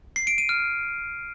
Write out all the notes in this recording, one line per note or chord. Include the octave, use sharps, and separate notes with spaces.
C7
D7
D#7
F6